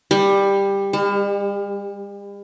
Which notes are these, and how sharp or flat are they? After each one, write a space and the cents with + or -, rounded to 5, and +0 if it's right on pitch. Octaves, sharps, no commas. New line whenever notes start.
G3 +15
G3 +45